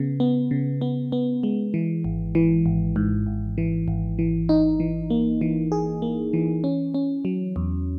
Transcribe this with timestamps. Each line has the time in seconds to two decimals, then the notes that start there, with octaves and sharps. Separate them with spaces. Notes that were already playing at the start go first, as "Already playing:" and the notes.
Already playing: C#3 B3
0.20 B3
0.51 C#3
0.81 B3
1.12 B3
1.43 G#3
1.74 E3
2.04 G#1
2.35 E3
2.66 G#1
2.96 G#2
3.26 G#1
3.58 E3
3.88 G#1
4.19 E3
4.49 D#4
4.80 E3
5.10 A#3
5.41 E3
5.72 G#4
6.02 A#3
6.33 E3
6.64 C#4
6.94 C#4
7.25 F#3
7.56 E2